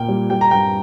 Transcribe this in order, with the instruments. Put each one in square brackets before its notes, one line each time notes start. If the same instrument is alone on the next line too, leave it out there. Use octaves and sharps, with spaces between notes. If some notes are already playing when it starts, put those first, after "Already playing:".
Already playing: [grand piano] A#2 A#3 G5
G3
G3 G5
A#5
G2 G5